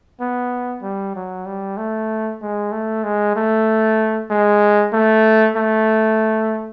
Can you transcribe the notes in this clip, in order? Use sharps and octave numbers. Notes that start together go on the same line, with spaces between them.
B3
G3
F#3
G3
A3
G#3
A3
G#3
A3
G#3
A3
A3